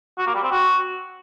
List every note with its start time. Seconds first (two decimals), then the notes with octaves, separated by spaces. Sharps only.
0.18 F#4
0.27 A#3
0.35 G3
0.43 C4
0.51 F#4